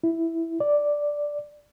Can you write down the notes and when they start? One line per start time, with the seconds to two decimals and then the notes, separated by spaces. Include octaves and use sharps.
0.04 E4
0.60 D5